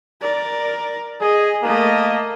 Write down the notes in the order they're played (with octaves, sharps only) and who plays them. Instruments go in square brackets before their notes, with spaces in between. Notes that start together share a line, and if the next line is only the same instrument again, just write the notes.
[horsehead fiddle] A#4 D5
[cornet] G#4 [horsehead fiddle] D#5
[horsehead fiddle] A3 D#5 [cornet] A#3